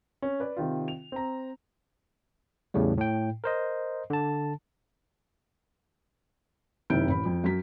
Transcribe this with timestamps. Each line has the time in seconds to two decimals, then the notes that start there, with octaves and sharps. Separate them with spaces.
0.22 C#4
0.40 B4 D5
0.57 C3 D#3 F4
0.88 F7
1.12 C4 A#5
2.74 E2 A2 C#3 G3
2.98 A2 G5
3.44 A#4 C5 D#5
4.10 D3 A5
6.90 F#1 C3 D#3 E4 G6 D7
7.08 A1 B5
7.25 F2
7.44 F#2 B6